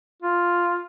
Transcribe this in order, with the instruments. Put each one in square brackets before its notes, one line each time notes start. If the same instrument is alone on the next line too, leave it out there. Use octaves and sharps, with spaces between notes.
[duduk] F4